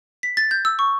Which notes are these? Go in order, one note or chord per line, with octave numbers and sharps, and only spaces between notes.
B6
A6
G6
E6
C#6